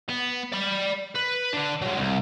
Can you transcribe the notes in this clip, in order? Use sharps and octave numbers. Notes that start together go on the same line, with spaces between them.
B3
D5 B5
B4
D3 D4
F#3 G#3
C2